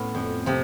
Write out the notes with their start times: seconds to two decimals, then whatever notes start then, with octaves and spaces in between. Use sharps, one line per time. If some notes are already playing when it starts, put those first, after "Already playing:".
Already playing: A2 B3 C#4
0.15 F2
0.46 C3 F3